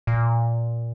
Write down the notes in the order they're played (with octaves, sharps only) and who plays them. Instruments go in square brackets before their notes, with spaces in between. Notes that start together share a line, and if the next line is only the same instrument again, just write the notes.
[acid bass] A#2